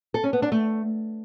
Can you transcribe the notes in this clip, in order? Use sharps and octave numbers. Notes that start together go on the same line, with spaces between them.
A4
C#4
B3
D4
A3